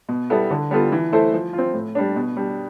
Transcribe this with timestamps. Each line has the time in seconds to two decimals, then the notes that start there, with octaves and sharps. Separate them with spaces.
0.09 B2
0.30 G3 B3 E4 A4
0.51 D3
0.71 G3 B3 F4 A4
0.92 E3
1.12 A3 E4 A4 C5
1.33 F3
1.53 F4
1.58 C4
1.73 A2
1.95 G3 D4
2.16 B2
2.36 G3 D4